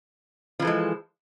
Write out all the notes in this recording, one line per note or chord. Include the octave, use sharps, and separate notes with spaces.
E3 F3 G#3 A4